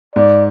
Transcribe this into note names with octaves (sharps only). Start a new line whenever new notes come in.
G#2 D5